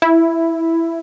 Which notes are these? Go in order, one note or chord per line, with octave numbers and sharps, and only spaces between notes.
E4